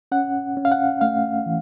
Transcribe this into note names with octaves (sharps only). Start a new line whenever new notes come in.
C#4 F#5
C#4
F5
F#5
A3 F5
E3